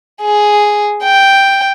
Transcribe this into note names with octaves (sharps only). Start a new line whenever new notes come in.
G#4
G5